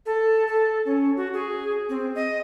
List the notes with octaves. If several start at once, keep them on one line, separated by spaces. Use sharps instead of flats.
A4
A4
C#4
F#4
G#4
C4
D#5